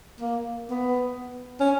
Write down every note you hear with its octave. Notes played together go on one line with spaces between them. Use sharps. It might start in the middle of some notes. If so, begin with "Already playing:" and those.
A#3
B3
C#4